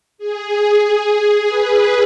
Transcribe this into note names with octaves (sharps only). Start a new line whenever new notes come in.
G#4
B4